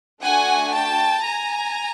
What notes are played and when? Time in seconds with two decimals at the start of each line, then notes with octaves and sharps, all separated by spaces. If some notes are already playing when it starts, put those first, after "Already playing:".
0.21 A3 D4 F#4 F#5 G#5
0.72 G5 A5
1.22 G#5 A#5